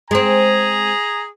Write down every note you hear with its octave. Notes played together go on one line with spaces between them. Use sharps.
G#3 C4 G#4 G#5 A#5